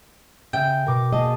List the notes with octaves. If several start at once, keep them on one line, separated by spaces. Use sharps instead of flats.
C#3 E5 G5
B2 A#4 D6
A#3 G#4 D#5 A5